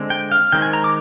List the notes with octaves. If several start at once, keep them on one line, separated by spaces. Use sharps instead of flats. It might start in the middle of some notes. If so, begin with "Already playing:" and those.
Already playing: D3 G#3 C4
G5
F5
D#3 G#3 C4 G5
G#5
A#5
D6